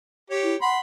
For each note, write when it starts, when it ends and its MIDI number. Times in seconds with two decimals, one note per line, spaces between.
0.30 0.55 67
0.30 0.55 73
0.44 0.57 64
0.61 0.80 78
0.61 0.79 83
0.61 0.79 84